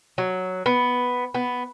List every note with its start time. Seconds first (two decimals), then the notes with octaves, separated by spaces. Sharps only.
0.18 F#3
0.66 B3
1.34 B3